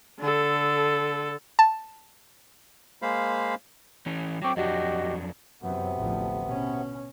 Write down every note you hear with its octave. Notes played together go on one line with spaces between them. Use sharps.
D3 A4
A5
G#3 A#3 C5 F5 B5
E3 C#4
F#3 C4 G5 C#6 D6
F2 F#3 D4 F#4 G4 D#5
F#2 C3 E3 F#3 B3
A1 D2 F3
B2 C#4